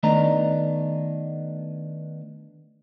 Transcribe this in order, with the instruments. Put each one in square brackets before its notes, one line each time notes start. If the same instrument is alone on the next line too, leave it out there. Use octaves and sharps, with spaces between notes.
[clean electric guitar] D#3 A3 B3 D4 D#5 A#5